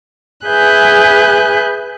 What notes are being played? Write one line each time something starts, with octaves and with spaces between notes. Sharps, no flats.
G#4 B4 E5 G#5 F#6 G6